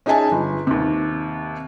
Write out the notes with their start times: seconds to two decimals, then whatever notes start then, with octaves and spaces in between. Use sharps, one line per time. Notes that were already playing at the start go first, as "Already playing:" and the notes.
0.06 C#4 D#4 G#4 E5 G#5 A5
0.32 G1
0.67 D#2 C3